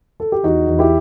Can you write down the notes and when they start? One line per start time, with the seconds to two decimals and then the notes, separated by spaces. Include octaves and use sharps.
0.20 A4
0.32 G4
0.43 E2 D#4 F#4
0.67 E2
0.79 E4 G4